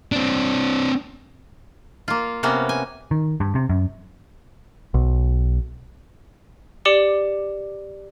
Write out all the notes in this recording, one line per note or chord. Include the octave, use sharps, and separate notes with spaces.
C4 D4
A#3 F4
C3 A#3 B3 C#4
G#5
D#3
G2
C3
F#2
B1
G4 D5 D6 C#7 F#7 G7